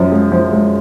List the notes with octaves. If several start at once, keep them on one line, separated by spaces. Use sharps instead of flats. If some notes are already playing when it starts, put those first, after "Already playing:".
Already playing: F#2 F3
G#3
F3
G#3